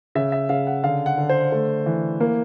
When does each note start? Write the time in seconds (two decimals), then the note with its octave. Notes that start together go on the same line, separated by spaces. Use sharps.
0.15 C#3 E5
0.32 E5
0.49 C#3 F5
0.67 F#5
0.83 D3 F5
1.06 F#5
1.17 D3
1.29 C5
1.52 A3
1.86 E3
2.20 A#3